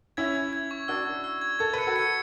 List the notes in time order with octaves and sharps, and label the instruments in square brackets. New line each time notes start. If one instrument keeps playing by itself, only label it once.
[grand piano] C#4 E4 [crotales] G#6
[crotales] G#6
G#6
C#6
[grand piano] D4 F#4 [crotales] E6
[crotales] E6
E6
G#6
[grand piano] A4 [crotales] G#6
[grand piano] B4 [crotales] C#7
[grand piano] F#4 A4
[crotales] C#7